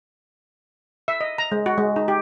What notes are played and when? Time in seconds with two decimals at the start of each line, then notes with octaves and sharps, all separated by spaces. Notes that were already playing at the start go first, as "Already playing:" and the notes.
1.08 E5
1.21 D#5
1.38 A#5
1.52 G#3
1.66 F#4
1.78 G#3
1.96 D#4
2.08 G4